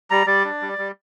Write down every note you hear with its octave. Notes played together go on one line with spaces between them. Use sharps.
G3 A#5
G3 D5
D4
G3
G3